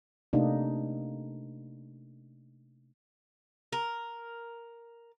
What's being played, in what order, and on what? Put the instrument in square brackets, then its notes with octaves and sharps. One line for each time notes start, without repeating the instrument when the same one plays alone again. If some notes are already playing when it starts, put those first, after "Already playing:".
[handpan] C3 A3 A#3 D4 D#4
[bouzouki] A#4